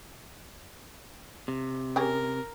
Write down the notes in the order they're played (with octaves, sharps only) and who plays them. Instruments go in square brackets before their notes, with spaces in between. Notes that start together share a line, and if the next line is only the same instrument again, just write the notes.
[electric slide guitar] C3
[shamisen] C#4 G4 G#4 [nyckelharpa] A#4